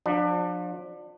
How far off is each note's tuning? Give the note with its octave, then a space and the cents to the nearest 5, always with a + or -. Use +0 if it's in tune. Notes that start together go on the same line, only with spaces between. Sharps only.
F3 +35 D4 +25